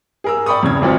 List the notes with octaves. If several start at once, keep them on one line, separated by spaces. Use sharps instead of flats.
G#4 A#4 E6
D5 G5 B5 C#6 D#6
E2 C#3 G#6
G#1 F2 F3 F#4